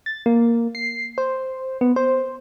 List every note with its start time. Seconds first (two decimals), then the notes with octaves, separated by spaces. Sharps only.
0.06 A6
0.26 A#3
0.75 C7
1.18 C5
1.81 B3
1.96 C5